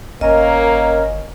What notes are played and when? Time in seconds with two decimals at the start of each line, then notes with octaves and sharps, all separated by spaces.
0.21 G1 A#3 C#4 A#4 D#5